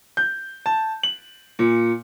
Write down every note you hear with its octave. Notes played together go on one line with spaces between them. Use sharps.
G6
A5
F#7
A#2